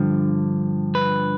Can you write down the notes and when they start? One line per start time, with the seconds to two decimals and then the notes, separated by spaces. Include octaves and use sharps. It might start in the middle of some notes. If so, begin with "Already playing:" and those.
Already playing: G2 D3 F3
0.95 B4